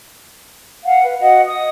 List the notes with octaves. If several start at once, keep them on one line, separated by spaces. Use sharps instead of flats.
F5 F#5
B4
F#4 D#5 F#5
D#6